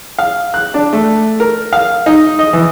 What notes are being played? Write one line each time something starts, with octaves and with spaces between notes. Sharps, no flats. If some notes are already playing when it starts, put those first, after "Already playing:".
F5
F#6
D4
A3
A#4
F5
D#4
D#5
E3